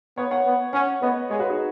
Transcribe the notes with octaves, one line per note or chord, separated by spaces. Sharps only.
B3 C#5 F#5
C#5 F#5
B3
C#4 C#5 F#5
B3 B4 D#5
G#3 G#4 C#5
F#4 B4
D#4 G#4